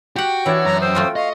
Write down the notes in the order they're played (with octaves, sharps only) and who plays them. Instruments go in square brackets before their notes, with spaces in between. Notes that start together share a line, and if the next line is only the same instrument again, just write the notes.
[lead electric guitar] F#4 [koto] G4 F#5 [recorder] G5
[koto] E3 E4 [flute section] D4 C#5 E6
[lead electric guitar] F#2 [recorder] A#5
[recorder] C5 [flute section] G5 D#6 E6
[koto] A3 F4 F#4
[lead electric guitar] D#5 [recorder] F5 [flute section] C#6